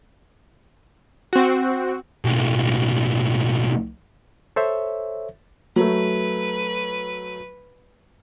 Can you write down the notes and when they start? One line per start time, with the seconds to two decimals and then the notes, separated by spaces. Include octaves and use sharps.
1.33 C4 F#4
2.25 B1 A2
4.56 A4 C5 C#5 E5
5.76 F#3 A3 B4